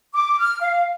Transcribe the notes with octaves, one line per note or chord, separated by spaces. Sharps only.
D6
F6
F5